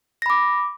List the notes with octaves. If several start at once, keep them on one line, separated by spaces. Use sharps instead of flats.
B5 D6 A#6